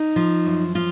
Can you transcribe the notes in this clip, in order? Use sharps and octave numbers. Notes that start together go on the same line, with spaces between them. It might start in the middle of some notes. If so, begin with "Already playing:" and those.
Already playing: D#4
F3
F#2
F3 F4